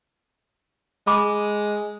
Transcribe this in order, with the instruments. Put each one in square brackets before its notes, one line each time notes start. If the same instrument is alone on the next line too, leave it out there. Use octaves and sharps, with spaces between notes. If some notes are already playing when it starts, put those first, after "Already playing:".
[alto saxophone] G#3 [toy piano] B5 D6